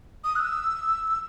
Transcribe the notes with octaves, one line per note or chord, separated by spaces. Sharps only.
D#6
F#6
E6